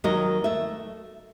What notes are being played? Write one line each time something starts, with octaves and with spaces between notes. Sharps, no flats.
D#2 F#3 A#4 D#5
A3 E5